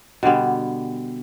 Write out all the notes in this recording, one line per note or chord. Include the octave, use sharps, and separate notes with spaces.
B2 D3 G3 B3